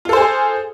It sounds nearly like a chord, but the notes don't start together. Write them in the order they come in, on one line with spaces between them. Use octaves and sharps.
F4 A4 C5 G#4